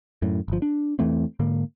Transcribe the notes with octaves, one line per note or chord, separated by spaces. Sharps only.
F#2 A2
G1 F3
D4
E2 E3 A3 C4
G#2 D3 A#3